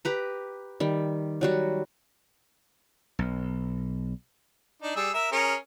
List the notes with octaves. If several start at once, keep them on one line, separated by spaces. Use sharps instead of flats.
G4 B4 A#5
D#3 G3
F#3 G3 F#4
B1
D4 D#4
G3 G#4 E6
A#4 E5
C#4 G#4 A#4